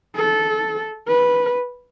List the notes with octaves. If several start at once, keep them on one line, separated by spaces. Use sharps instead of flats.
A4
B4